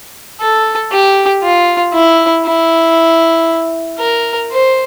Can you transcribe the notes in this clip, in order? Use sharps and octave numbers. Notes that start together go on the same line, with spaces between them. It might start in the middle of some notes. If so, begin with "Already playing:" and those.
A4
G4
F4
E4
E4
A#4
C5